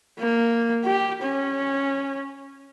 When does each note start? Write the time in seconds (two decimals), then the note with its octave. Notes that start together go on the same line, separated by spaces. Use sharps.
0.19 A#3
0.85 G4
1.22 C#4